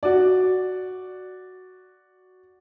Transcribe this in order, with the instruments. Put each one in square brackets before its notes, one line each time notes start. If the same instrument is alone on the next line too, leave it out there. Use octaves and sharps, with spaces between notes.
[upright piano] F#4 D5